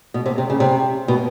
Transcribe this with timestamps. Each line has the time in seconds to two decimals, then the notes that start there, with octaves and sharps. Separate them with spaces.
0.14 B2
0.26 C3
0.38 C3
0.50 C#3
0.60 C3
1.08 B2